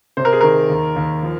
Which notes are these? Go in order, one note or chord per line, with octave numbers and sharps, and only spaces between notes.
C3 C5
A#4
G#4
D#3 A#4
D#2
D#2
F3